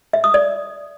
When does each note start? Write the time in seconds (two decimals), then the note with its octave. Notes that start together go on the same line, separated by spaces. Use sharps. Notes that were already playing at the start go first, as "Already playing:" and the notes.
0.13 E5
0.24 D#6
0.34 D5